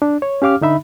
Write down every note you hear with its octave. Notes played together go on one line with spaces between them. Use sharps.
D4
C#5
C#4 G4 F5 D6 F6
D3 D#4 E5 B5